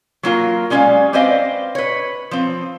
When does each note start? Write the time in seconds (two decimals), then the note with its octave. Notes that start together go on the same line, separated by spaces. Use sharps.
0.23 F#3 A#3 F4 A#4
0.70 G3 G#3 C#4 C#5 D5 F5
1.13 C4 B4 C5 D5 D#5 F5
1.75 B4 C#5
2.31 F3 C4